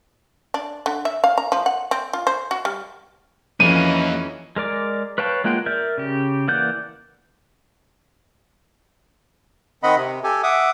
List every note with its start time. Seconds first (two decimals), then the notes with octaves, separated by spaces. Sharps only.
0.54 D4
0.86 D3
1.05 E5
1.24 F5
1.38 A#5
1.52 F3
1.66 F#5
1.91 C4
2.13 F4
2.27 C5
2.51 F#4
2.65 G3
3.60 F2 E3 A#3 C#4 D#4 D#7
4.56 G#3 A#4 D5 D6
5.18 B4 C#5 F5 G5 A5
5.44 G#3 A#3 F4 F#5 G5
5.66 A#4 D5 E5 G6
5.98 C#3 G4
6.48 E3 A#3 D5 F#5 G6
9.83 D#3 C4 D#5 F#5 B5
9.96 C3
10.24 G4 A4 G#5
10.43 E5 F#5 D6 D#6